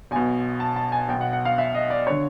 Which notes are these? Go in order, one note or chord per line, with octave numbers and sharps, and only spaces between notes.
B1 B2 G#5
A5
A5
G#5
B1 G5
B2
F#5
F#5
F5
E5
D#5
D5
D3 C#5